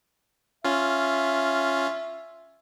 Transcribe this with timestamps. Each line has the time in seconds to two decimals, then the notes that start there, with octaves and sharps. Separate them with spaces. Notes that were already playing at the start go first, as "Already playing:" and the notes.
0.64 C#4 F4 E5